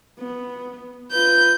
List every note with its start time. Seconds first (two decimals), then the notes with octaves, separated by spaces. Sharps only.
0.19 B3
1.12 F4 B4 G6